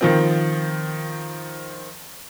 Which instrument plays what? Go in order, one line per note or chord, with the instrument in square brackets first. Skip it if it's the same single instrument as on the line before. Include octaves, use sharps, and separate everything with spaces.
[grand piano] D#3 F3 C4